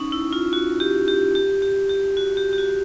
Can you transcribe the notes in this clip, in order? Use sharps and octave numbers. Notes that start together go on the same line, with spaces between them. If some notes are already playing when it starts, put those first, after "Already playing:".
Already playing: C#4 D#4
E4
F4
F#4
G4
G4
G4
G4
G4
F#4
G4
G4
F#4